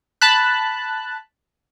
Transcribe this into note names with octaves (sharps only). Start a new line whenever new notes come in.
A5 B5 F#6